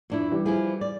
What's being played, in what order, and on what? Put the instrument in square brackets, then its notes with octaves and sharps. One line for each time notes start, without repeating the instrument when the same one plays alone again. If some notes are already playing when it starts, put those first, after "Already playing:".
[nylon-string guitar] F2 D4 E4
[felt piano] E3 G3
[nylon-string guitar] F3 E4 G#4
D5